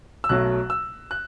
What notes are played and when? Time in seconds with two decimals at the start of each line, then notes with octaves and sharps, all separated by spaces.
0.24 E6
0.29 B1 B2 F#3 A3 F#6
0.70 E6
1.11 F#6